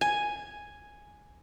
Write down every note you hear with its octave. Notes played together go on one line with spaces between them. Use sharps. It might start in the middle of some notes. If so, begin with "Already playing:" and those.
G#5